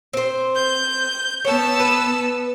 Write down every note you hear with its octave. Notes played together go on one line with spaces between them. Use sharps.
C4 C5
G6
B3 C#5 A5 E6
B4